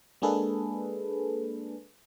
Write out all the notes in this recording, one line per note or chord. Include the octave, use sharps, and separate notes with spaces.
G#3 A#3 D4 G#4 A4 B4